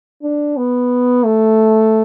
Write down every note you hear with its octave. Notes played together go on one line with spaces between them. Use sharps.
D4
B3
A3